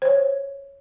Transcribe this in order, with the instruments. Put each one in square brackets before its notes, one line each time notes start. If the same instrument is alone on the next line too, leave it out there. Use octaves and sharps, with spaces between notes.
[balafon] C5 C#5